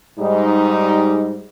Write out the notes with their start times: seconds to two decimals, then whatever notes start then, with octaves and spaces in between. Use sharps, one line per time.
0.19 G#2 G3 D#4